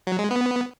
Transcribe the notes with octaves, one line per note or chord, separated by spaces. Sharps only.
F#3
G#3
B3